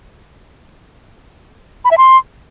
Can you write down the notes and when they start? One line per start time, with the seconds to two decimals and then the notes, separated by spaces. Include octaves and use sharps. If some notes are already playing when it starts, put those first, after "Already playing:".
1.85 B5
1.91 E5
1.98 C6